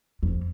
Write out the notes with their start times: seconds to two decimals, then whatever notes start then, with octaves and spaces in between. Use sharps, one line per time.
0.23 F2